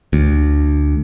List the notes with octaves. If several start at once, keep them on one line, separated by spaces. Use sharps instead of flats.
D2